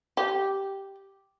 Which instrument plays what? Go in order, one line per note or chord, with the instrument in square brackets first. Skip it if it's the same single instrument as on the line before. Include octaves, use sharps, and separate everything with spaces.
[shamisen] G4